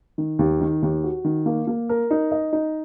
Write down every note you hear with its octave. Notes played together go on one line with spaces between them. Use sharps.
D#3
D#2
D#3
D#2
F#4
D#3
A#3
A#3
A#4
D#4
D#5
D#4